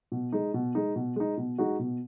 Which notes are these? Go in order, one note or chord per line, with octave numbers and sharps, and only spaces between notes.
B2
G#3 D#4
B2
G#3 D#4
B2
G#3 D#4
B2
G#3 D#4 F#4
B2